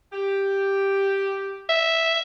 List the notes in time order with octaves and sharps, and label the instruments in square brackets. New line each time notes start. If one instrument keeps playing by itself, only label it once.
[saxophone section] G4
[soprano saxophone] E5